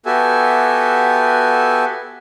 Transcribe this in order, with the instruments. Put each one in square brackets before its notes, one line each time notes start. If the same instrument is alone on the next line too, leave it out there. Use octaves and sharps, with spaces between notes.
[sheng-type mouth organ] B3 F#4 G4 A4 E5 G#5